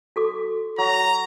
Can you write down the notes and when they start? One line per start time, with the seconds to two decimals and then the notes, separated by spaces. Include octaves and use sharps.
0.16 F#4 A4 D6
0.78 F#3 A#5